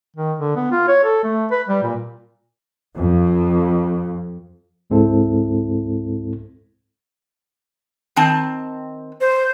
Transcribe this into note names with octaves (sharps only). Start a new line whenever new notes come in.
D#3
D3
B3
F4
C#5
A4
A3
B4
G3
A#2
F2
C#2 G#2 G#3 C4 E4 A4
D#3 C4 A5
C5